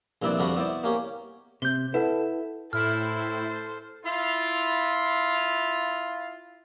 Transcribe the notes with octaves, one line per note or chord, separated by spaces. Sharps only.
A#1 G2 C4 E4 B4 D5
F2 D3 G3 D4 F#4 B5
B3 E4 C5 D5
A#3 C#4 G4
C3 G6 G7
E4 A4 B4 F#5
A2 E4 A4 C5 F6
E4 F4